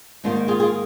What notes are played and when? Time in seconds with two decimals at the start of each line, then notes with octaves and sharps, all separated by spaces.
0.24 G#2 D#3 A#3 D4 F4
0.48 F4 G#4
0.60 F4 G#4